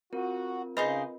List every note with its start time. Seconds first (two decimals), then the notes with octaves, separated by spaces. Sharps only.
0.13 C4 F4 F#4 A#4
0.77 C#3 D#4 G#4 B4 C5 D#5 B5